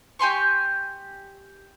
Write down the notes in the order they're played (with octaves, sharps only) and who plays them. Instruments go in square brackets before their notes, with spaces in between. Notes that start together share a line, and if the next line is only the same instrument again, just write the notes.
[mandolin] G4 G#5 C6 C#6